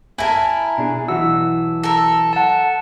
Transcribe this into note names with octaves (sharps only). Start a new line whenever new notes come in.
E4 A#4 G#5 A5
B2 D4 G#4
B1 E3 F#4 E6
A4 A#4
F#5 A5